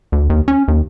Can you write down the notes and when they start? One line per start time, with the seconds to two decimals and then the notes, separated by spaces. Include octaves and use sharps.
0.12 D2
0.30 D#2
0.48 C#4
0.68 D#2